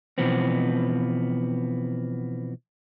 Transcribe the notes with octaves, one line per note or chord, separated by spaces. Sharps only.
B2 E3 F3 B3 C4